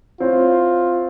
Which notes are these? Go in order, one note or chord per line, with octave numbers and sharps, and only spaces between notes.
C4 E4 F4 C#5